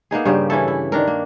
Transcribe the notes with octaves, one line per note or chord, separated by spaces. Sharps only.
A#3 B3 D#4 G#4
G2 C#3 A#3 G4
E3 C#4 E4 A4
E4
D#3 D4 A#4
A#3